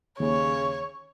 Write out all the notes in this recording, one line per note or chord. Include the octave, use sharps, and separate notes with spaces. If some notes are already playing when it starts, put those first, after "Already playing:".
D#2 C#3 C#5